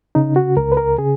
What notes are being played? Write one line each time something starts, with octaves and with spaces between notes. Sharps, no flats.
C#3 D#4
F#4
C#2 A#4
B4
A#4
C#3 G#4